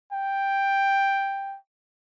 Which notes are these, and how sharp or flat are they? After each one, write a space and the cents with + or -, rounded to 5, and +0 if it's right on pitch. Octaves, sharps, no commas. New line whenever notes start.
G5 +5